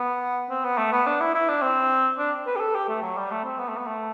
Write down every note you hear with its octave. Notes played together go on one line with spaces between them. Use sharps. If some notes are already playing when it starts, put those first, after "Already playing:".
Already playing: B3
C4
B3
A3
B3
D4
E4
E4
D4
C4
D4
B4
G4
A4
G4
A3
F#3
G3
A3
C4
B3
A3
B3
A3